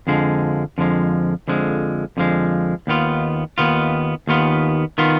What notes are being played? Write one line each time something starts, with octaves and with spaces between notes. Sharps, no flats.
F2 D3 F3 G#3
F2 D3 F3 G#3
F2 D3 F3 G#3
F2 D3 F3 G#3
D#2 D#3 B3 F4
D#2 D#3 B3 F4
D#2 D#3 B3 F4
D#3 B3 F4